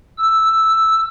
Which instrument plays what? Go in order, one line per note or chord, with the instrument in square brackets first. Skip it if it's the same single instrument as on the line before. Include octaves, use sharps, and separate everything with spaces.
[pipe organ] E6